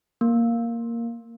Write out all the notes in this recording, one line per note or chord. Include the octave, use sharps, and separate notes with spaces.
A#3